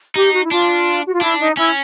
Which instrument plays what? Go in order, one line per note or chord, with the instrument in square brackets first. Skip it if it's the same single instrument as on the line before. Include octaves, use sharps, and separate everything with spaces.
[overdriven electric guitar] D#4 [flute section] G4
[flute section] F#4
E4
[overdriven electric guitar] D4 [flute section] F4
[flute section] F#4
F4
[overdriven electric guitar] D4 [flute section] E4
[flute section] D#4
[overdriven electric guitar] C#4 [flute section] E4